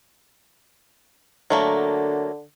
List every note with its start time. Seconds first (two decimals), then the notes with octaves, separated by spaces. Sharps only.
1.50 D3 F#3 A3 A#3